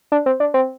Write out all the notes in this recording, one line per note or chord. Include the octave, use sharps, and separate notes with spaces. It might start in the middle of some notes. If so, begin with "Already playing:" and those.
D4
C4
D4
C4